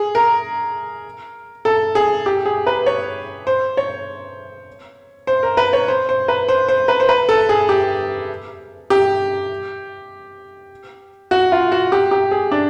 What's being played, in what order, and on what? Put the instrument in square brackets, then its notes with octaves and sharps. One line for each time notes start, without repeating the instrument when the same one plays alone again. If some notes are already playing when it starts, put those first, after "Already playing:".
Already playing: [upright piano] G#4
A#4
A4
G#4
G4
G#4
B4
C#5
C5
C#5
C5
A#4
B4
C#5
C5
C5
B4
C5
C5
B4
C5
B4
A4
G#4
G4
G4
F#4
F4
F#4
G4
G4
G#4
D4